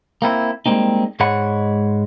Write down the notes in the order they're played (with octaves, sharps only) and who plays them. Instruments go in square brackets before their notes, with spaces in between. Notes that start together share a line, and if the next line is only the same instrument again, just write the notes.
[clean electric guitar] A#3 C4 E4
G3 G#3 A#3 C4 D#4
G#2 G#3 C#5 F#5 B5